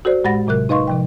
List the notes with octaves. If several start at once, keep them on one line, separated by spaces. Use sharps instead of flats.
F#4 A4 C5 D5
A2 G#3 F#5 B5 A6 A#6
A2 C3 F#3 A#4 F#6
D#4 B4 D#5 F5 C6 C#6
C3 F3 G5